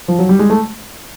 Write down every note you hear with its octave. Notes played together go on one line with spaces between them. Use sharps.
F3
F#3
G3
G#3
A3